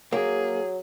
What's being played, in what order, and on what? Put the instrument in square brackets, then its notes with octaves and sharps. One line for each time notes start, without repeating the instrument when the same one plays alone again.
[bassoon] F#3 [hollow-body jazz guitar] A#3 [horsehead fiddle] G#4